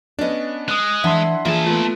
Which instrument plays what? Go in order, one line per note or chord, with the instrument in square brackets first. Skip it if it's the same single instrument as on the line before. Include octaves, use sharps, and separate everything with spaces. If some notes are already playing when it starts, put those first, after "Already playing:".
[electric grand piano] B3 C#4 D4 [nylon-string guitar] D5 D#5
[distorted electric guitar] G#3 [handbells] D#6 F#6
[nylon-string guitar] E3 [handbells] D4 E5 [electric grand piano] F#5 C6
[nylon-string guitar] E3 [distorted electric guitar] A#3 A5 [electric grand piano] F4 G#4
[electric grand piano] A3 B3 [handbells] F4